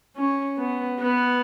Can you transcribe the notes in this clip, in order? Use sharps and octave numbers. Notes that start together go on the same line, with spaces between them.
C#4
B3
B3